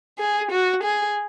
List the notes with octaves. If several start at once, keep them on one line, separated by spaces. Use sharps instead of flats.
G#4
F#4
G#4